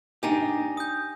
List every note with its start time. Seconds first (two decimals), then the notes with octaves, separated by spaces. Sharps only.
0.23 D4 D#4 G4 G#5 A#6
0.77 D#6 G6